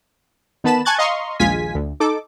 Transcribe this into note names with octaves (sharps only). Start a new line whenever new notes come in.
D#3 B3 B4 A5 B5 E7
G#5 A5 C#6 F#6 G#6 A6
D#5 F5 A#5 C6 C#6
A#1 D#2 G#3 F4 G#5 B6
D2
D#4 A4 D6